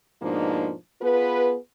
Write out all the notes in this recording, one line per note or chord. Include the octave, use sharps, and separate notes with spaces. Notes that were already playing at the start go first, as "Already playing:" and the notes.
G#2 B2 F3 A#3 D4 D#4
B3 F4 G#4 B4